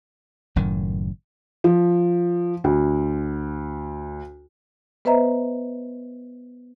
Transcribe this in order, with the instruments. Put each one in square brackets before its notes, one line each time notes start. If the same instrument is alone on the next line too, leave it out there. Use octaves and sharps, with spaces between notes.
[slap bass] F#1 F#2 A2 D#3
[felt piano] F3
D2
[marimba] B3 B4 C5 D#5 E5 A#5